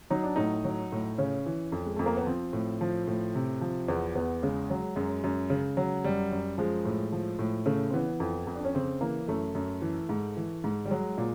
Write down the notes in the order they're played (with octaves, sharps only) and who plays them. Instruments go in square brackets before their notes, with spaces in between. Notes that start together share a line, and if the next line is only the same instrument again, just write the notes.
[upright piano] F#3 D#4
D4
A2 D#4
F#3
A2
C#3 C#4
E3
F2
G#3
F2 A3
A#3
B3
F3 C4
A2
F3
A2
C3
F3
E2 B3
E2 B3
C#3 G#3
F#3
F#2 G#3
F#2
C#3
F#3
F#2 G3
F#2
F3 G#3
A2
F3
A2
C#3 A3
C4
E3 B3
F2
F2
D4
C#4
C#3 C4
E3 A#3
F#2 A3
F#2
E3
G#2
E3
G#2
G3
F#3 G#3
A#2